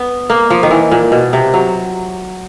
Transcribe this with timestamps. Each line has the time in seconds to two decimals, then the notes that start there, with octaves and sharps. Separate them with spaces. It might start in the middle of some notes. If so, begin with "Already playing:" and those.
Already playing: B3
0.30 A#3
0.50 F3
0.63 D#3
0.71 E3
0.91 A#2
1.12 B2
1.33 C3
1.54 F#3